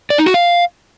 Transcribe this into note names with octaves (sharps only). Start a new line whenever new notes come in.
D5
D#4
F#4
F5